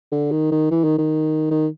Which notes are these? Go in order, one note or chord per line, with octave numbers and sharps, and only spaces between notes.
D3
D#3
D#3
E3
D#3
D#3
D#3